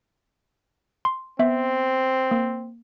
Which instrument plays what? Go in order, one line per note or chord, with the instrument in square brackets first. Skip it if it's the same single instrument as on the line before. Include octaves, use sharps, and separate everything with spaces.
[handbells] C6
[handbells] B3 E5 [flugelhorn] C4
[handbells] A#3